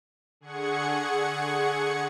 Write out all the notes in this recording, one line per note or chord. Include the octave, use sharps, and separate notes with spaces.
D3 G#4 F#5 C#6 G#6 C#7